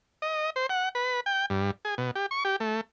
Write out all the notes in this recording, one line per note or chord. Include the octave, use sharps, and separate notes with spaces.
D#5
C5
F#5
B4
G5
G2
G#4
B2
G4
C#6
G4
A3